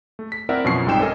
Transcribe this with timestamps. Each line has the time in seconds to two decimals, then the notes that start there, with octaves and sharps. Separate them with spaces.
0.19 A3
0.32 B6
0.49 C4 E4 A#4 D5 E5 F#5
0.64 F#2 B2 F3 C#4 C#6 C7
0.86 C2 G#2 C3 G5 E7
1.00 C#4 A4 A#4 D#5 G#5